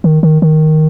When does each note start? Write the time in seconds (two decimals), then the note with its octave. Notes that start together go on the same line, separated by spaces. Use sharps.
0.04 D#3
0.23 D#3
0.42 D#3